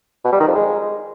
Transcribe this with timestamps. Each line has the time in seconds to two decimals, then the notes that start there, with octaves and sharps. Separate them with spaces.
0.25 B2
0.32 G3
0.40 D#3
0.48 F2
0.55 G#3